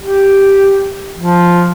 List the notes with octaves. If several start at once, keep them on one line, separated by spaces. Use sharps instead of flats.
G4
F3